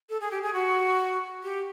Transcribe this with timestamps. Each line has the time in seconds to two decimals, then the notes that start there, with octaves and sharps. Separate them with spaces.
0.09 A4
0.21 G#4
0.31 G4
0.43 G#4
0.53 F#4
1.43 G4